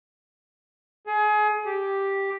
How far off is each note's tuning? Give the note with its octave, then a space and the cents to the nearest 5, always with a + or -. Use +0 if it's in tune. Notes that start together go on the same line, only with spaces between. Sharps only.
G#4 +30
G4 +0